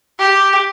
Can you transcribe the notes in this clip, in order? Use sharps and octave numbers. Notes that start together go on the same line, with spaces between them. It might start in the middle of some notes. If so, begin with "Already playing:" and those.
G4